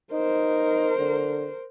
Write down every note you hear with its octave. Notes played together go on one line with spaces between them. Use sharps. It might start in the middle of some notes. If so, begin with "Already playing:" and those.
D#4 A#4 C5
D3